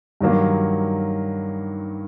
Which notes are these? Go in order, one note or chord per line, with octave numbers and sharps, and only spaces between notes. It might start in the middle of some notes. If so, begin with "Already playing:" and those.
G2 D#3 F#3 A#3